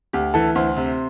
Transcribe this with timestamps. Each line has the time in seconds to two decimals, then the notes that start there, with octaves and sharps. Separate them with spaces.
0.13 D2 G4
0.34 E3 A4
0.55 D2 C5
0.77 C3